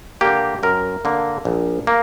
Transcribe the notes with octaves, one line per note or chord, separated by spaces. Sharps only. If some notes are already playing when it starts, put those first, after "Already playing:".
D3 A#3 G4
F#2 A#4
D3 A#3
A#1
A#3